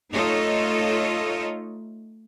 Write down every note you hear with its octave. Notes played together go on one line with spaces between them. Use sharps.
A3 D#4 F4 A4 C#5 D#5